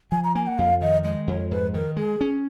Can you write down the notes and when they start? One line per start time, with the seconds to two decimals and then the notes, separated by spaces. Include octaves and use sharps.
0.12 F3 G#5
0.24 A#5
0.35 A#3 G#5
0.47 F#5
0.58 F2 F5
0.81 D#3 D#5
1.04 G#3 D#5
1.27 F2 C#5
1.51 G#2 B4
1.74 D#3 A#4
1.97 G#3 G#4
2.21 C#4